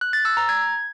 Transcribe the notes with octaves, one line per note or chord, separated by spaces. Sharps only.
F#6
A6
E6
A#5
G#6